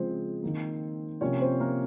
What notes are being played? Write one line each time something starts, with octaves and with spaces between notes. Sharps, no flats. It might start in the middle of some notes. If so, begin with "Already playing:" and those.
Already playing: C#3 F3 G#3 C4 C5
D#3 A#3
C3 F3 A#3 C#4 C#5
C4 C5
A#3 A#4